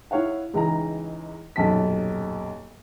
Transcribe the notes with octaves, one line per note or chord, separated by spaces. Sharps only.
E4 C#5 F5 F#5
C#2 E3 D#4 G#4 A#5
D#1 B1 F#2 A5 B6